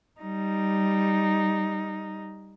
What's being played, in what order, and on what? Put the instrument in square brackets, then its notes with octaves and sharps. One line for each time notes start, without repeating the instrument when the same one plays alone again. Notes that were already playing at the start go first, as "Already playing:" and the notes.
[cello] G3 D#4